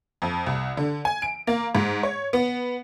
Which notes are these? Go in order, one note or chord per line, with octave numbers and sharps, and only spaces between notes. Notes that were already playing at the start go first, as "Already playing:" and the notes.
F2
C2
D3
G#5
D7
A#3
G#2
C#5
B3